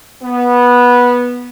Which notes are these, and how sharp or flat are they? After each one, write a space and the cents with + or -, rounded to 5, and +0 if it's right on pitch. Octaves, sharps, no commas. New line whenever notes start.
B3 -15